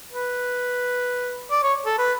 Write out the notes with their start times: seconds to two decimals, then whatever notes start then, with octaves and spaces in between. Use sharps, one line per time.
0.11 B4
1.51 D5
1.63 C#5
1.86 A4
1.98 B4